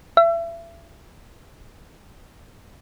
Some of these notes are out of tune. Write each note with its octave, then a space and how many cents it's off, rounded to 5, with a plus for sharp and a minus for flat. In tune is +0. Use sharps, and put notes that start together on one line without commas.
E5 +35